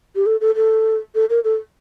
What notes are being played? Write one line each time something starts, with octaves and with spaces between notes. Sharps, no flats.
G4
A4
A4
A4
A4
A#4
A4